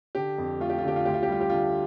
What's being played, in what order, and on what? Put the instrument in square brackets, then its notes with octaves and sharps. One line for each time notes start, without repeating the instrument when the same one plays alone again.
[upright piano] D3 G4
F2
A3 F4
G4
F4
D3 G4
F4
D2 G4
F4
G4
G3 F4
G4
D3 F4